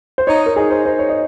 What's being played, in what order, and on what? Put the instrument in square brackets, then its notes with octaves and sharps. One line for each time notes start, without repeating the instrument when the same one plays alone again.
[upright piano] C5
[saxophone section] D#4 [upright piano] C#5
[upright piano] A#4
[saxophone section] D#4 [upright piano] G#4
[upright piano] C5
[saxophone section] D#4 [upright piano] C5
[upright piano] C#5
D#5